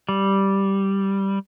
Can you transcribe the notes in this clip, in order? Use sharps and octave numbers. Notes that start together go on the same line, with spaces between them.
G3